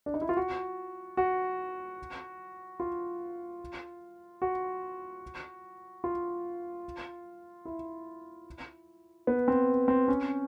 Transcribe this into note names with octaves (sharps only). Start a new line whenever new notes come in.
D4
D#4
E4
F4
F#4
F#4
F4
F#4
F4
E4
B3
C4
C4
C#4